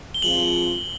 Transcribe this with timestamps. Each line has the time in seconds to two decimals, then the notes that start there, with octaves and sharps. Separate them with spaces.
0.14 G7
0.22 F3 G#3 C4 F4 F#7